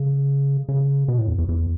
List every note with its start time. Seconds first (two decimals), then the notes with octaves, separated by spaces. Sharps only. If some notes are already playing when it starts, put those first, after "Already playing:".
Already playing: C#3
0.69 C#3
1.08 B2
1.18 A2
1.28 E2
1.38 E2
1.49 E2